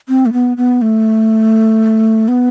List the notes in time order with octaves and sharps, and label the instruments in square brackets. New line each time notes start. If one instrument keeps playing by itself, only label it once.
[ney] C4
A3
B3
B3
A3
B3